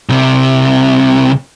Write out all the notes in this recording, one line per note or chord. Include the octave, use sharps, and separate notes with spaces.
C2 C3